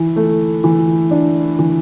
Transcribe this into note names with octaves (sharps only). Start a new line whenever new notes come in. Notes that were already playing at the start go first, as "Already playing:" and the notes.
Already playing: E3
A3
E3
D4
E3